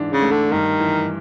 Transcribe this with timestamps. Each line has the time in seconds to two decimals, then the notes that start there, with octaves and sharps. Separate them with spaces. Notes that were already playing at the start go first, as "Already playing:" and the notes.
Already playing: G#2 E3 D4
0.12 C#3
0.22 A3
0.32 D3
0.52 G2 D#3
0.80 E3